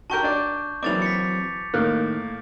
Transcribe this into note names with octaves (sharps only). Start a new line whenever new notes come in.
F#4 G4 A#4 A5 C#6 G6
D4 D5
E3 F#3 A#3 C4 D5 D6 A6 F7
B6 C#7
A2 D#3 A#3 F6 F#6